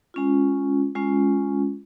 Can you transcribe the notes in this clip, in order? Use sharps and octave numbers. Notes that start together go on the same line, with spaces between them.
G#3 C#4 F4
G#3 C#4 F4